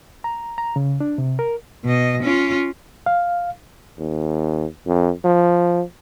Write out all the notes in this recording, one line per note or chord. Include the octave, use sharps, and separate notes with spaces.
A#5
A#5
C#3
D4
C3
A#4
B2 D#5
C#4 F4
F5
D#2
F2
F3